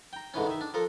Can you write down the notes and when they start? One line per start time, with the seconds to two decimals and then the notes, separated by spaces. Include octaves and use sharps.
0.13 G5 A#5
0.34 G#2 D3 E3 C#4
0.46 D#3 E5
0.61 D4
0.74 F3 A4 A#4